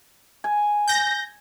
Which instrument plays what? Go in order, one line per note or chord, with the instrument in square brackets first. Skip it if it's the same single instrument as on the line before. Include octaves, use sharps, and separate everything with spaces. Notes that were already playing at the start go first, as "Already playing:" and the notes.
[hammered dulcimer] G#5
[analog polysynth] G6 A#6